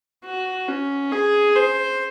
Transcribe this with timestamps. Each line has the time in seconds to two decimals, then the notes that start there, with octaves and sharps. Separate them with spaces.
0.25 F#4
0.68 C#4
1.12 G#4
1.55 C5